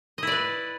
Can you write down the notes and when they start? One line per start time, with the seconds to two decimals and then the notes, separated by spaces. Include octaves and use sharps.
0.18 D#5
0.23 E4
0.27 D5
0.32 B4